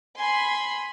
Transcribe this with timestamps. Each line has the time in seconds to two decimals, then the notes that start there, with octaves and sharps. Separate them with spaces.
0.17 G#5 B5 C6